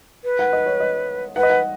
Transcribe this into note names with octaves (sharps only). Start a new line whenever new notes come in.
B4
F#5
D#5
C#5
D#5
B4 F#5
D#5
F#5